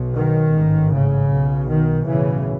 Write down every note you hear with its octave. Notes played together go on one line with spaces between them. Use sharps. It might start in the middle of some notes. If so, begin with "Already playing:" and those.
Already playing: B1 B2
D#3
A1 G#2
C#3
B1 B2
D#3
B1 A2 C#3 E3